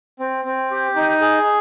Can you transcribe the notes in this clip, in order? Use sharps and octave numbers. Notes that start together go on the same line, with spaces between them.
C4
C4
G4
D#4
G#4